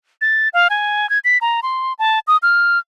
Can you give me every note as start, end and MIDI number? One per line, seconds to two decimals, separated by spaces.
0.21 0.49 93
0.53 0.68 77
0.70 1.09 80
1.10 1.19 92
1.24 1.38 95
1.41 1.60 82
1.63 1.93 84
1.99 2.19 81
2.27 2.37 87
2.43 2.79 89